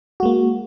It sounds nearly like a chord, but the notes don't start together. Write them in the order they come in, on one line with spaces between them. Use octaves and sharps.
F#4 G#3 A#3